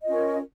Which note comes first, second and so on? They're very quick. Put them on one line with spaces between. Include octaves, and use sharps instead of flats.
D#5 F4 C#4 A#4